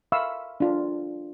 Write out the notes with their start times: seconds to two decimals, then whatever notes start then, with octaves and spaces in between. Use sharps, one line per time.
0.12 E5 F5 B5 C#6 E6
0.60 D4 F4